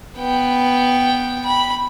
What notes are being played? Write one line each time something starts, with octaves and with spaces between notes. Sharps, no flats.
B3 G5
B5